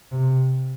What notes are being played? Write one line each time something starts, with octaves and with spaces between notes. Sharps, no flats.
C3